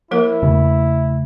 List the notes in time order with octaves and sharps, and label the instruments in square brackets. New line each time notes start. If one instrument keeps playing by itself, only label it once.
[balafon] F3 A#3 A#4 [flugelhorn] E4
[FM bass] E2 [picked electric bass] C#3 A3